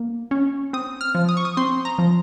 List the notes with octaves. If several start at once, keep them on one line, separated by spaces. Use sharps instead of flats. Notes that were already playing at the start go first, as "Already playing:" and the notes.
Already playing: A#3
C#4
C4 D#6
F6
F3
D#6
C#6
D#6
C4 C6
A#5
F3